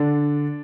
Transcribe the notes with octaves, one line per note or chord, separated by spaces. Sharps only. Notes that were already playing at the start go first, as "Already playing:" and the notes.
Already playing: D3 D4